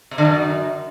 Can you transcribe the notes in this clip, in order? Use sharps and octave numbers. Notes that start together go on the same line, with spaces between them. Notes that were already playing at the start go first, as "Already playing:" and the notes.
C3
D3
F#2